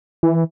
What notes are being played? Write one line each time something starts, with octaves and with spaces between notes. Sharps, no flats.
E3